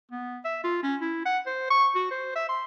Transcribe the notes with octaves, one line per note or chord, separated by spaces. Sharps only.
B3
E5
F4
C#4
E4
F#5
C5
C#6
F#4
C5
E5
C6